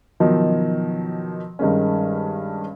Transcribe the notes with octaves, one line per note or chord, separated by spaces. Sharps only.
B2 D#3 F3 F#3
G2 D#3 G#3 C#4